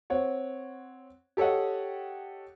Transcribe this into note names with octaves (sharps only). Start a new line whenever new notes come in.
C4 C#5 F#5
G4 A4 C#5 D#5 F#5